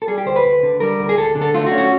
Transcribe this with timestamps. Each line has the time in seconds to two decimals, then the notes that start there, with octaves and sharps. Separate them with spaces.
0.02 A4
0.07 G3 G#4
0.18 G4
0.26 D2 C5
0.36 B4
0.45 D2
0.63 D3
0.80 G3 A#4
0.99 D2
1.09 G#4
1.18 D2 A4
1.35 D3
1.41 A4
1.54 A3 F4
1.66 F#4
1.72 C#4
1.78 F#4